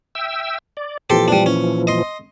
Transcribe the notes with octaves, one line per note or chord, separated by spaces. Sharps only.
E5 G5 E6
D5
A#2 E3 F3 G4 A4 C6
G3 D4
C#4
D#5 C6